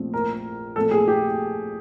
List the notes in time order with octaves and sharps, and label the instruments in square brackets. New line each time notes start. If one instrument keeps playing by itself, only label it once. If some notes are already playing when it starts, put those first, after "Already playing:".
Already playing: [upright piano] A#1 A#2 F3 A3 C4
[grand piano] A#4
[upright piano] A#2 F3 A3 C4 [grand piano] A4
[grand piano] G#4
G4